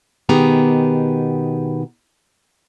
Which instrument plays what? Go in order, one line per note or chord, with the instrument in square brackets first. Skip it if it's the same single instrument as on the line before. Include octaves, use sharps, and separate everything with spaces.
[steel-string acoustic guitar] B2 D#3 B3 G4 G#4 A#5